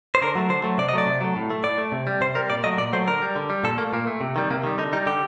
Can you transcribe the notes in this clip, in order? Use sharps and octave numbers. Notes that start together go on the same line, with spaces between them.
C5
D3 A#4
F#3 A3
D3 C5
F#3 A3
C3 D5
D#5
F#3 A3 D5
C3
F#3 A3
A2
A3
A2 D5
A3
C3
G3
C3 C5
G3 A#4
A#2 D5
F#3 A3 D#5
A#2 D5
F#3 A3 C5
D3 A#4
G3
D3
G3
A#2 A4
A3 A#3
A#2 A#3
A3
C3
D#3 G3
C3 A#3
D#3 G3
D3 D#4
G3 D#4
D3 G4